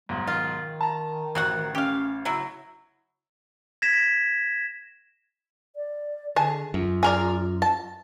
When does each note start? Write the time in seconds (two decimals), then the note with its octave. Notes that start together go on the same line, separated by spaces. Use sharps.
0.09 B1 G#2 G3
0.27 D#3 F4
0.81 A5 A#5
1.35 A1 C4 F#4 F#5
1.75 C#4 G4 F5
2.25 C#3 F#3 E4
3.82 G#6 A#6 B6 E7
5.76 D5
6.36 D3 G#4 A5
6.74 F#2 F4
7.03 G#4 A#4 D5
7.62 A5